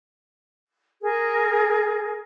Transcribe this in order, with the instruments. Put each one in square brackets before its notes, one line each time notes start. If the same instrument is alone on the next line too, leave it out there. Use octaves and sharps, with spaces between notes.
[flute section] G#4 A#4